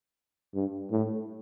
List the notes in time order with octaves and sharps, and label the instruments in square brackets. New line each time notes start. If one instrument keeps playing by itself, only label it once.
[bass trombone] G2
A2